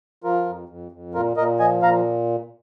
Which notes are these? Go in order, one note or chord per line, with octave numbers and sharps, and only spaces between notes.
F3 F4 A#4
F2
F2
F2
A#2 F4 A#4
A#2 A#4 D#5
F3 D#5 G#5
A#2 F5 A#5